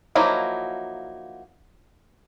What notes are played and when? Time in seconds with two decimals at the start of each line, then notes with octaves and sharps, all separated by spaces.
0.15 F3 F#3 A#3 D#4 E4